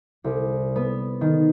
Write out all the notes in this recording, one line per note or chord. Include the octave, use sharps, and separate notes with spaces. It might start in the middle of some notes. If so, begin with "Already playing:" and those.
C2
B3
D#3